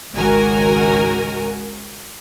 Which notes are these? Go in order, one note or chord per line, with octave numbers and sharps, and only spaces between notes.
G#1 C#2 D#3 F#4 A#4 G#5